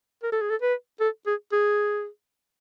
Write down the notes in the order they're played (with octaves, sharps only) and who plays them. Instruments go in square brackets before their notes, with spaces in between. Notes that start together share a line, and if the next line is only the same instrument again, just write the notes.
[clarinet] A#4
A4
G#4
A4
B4
A4
G#4
G#4